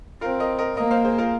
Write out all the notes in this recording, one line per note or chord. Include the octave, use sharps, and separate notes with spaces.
C4 F4 A#4
A#4 D#5
A#4 D#5
A#3 A#4 D#5
C5 F5
G#4 C5
F4 A#4